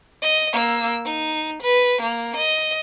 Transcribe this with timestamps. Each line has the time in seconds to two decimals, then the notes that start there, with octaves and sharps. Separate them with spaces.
0.22 D#5
0.53 A#3 E6
1.05 D#4
1.62 B4
2.01 A#3
2.36 D#5